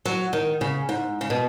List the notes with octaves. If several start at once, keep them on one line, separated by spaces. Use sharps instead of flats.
F#3
D#3
C#3
G#2
C#3
B2